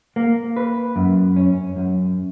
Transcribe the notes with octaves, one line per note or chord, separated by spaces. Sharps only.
A#3
B4
F#2
C#4
F#2